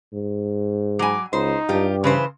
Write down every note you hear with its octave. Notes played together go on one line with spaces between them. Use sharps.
G#2
F#3 G#5 D6
C#2 D#4 C5
G2 F4 G4
C#3 E3 B4 C5